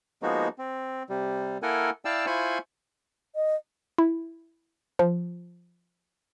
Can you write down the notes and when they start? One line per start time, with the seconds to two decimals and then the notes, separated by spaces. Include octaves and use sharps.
0.23 F3 G#3 A#3 B3 D#4 F#4
0.58 C4
1.09 C3 G3
1.63 A#3 E4 A4 A#4 F#5 G#5
2.05 E4 D5 F5 G5 A5 E6
2.26 E4 F4 C5 G#5 B5 C#6
3.36 D#5
3.98 E4
4.99 F3